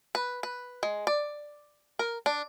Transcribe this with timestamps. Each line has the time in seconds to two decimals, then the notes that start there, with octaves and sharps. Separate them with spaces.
0.15 B4
0.43 B4
0.83 G#3
1.07 D5
1.99 A#4
2.26 D4